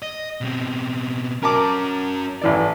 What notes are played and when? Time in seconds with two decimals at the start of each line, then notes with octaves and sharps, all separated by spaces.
0.02 D#5
0.41 B2 C4
1.43 C#4 F#4 A#4 A5 D6
2.42 A1 E3 D5